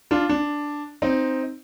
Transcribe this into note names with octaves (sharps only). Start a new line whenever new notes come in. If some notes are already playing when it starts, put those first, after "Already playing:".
D4 F4
D4
C4 D#4